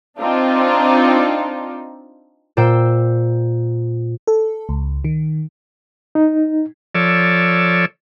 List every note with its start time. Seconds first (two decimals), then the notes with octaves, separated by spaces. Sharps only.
0.19 C4 D4 D#4 F4
2.57 A#2 C5 G5 E6
4.27 A4
4.69 C#2
5.04 D#3
6.15 D#4
6.95 F3 A4 C#5 D5 E6